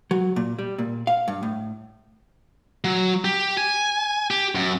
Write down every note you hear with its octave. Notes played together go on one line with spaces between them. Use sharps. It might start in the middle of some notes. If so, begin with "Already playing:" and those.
F#3
A#2
G3
A#2
F5
G2
A2
F#3
G4
G#5
G4
F#2